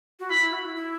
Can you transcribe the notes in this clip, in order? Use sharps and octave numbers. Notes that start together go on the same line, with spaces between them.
F#4
E4 B5
E4
F#4
E4
E4